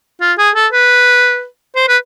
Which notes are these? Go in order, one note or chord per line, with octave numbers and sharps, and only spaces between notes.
F4
G#4
A4
B4
C5
B4